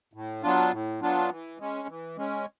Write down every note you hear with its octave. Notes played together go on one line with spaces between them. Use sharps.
A2
F#3 B3 D4 F4
A2
F#3 B3 D4 F4
E3
G#3 C#4
E3
G#3 C#4